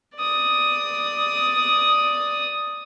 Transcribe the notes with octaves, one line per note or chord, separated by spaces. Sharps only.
D5 D#6